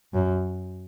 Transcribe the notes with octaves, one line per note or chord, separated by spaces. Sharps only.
F#2